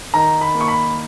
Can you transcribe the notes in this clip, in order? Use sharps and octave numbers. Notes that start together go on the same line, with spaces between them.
D#3 A#5
B5
A#3
C#6
B5